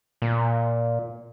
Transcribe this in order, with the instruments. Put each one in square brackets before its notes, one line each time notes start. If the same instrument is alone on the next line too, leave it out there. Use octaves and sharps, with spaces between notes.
[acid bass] A#2